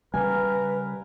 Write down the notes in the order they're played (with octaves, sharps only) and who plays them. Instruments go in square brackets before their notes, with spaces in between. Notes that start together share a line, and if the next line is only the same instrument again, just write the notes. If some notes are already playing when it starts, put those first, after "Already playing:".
[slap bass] C#3 G3 [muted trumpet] A#4 [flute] B4 [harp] G#5